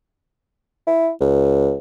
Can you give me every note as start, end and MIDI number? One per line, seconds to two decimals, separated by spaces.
0.87 1.10 64
1.20 1.76 37